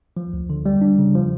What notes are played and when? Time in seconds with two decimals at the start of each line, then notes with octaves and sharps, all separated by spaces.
0.17 F3
0.33 D2
0.50 D3
0.66 G3
0.81 D4
0.99 C#3
1.15 F3